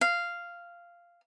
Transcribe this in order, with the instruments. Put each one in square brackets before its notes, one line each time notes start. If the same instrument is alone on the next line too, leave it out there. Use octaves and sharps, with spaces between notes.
[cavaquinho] F5